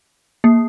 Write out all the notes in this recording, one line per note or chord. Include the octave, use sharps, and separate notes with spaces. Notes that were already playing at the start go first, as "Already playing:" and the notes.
A#3